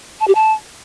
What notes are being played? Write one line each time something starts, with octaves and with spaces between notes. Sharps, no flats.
A5
G4
A5